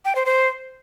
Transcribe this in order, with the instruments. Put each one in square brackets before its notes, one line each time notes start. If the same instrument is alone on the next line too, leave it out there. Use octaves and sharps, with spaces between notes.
[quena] G5
C5
C5